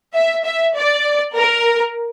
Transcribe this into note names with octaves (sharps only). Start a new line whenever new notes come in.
E5
E5
D5
A#4